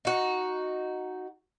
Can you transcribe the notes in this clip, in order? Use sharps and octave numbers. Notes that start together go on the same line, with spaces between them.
D#4 F#4